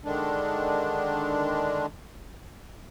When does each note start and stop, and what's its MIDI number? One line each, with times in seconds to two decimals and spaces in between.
0.05 1.86 50
0.05 1.86 51
0.05 1.86 56
0.05 1.86 62